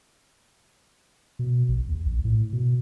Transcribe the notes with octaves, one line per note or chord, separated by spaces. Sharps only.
B2
A#1
D#2
A#1
A2
B2